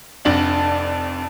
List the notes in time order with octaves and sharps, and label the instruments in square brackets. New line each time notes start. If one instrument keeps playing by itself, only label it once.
[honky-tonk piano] F1 F2 D4 F#7